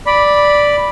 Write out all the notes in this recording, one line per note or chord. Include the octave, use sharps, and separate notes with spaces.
D5 B5